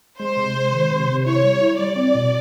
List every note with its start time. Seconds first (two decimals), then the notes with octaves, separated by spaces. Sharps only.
0.19 G#3 C5
0.37 C3
0.54 G#3
0.72 D#3
0.91 C3
1.08 C3
1.25 E4 C#5
1.43 G3
1.61 E4
1.78 G3 D5
1.96 C4
2.15 B2